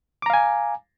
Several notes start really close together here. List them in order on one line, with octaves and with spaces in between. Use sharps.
D6 A#5 F5 G#5